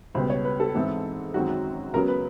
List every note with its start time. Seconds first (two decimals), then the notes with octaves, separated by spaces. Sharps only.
0.15 C#2 B2 G3 B3 C5
0.30 C#5
0.45 B4
0.60 A4
0.74 G#2 E3 G#3 C4
1.34 F#2 D#3 G#3 C4 F#4
1.94 C#2 C#3 F#3 B3 A#4
2.08 B4